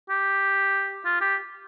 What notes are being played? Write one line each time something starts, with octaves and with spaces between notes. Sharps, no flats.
G4
F4
G4